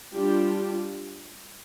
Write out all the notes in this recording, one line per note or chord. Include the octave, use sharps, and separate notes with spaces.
G3 D4 F4 G4